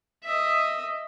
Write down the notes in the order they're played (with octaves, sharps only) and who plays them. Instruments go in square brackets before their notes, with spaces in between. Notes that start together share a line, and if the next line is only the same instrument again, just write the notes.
[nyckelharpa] D#5 E5